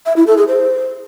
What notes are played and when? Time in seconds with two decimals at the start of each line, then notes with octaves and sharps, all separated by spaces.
0.06 E5
0.16 E4
0.27 A4
0.37 G#4
0.48 C5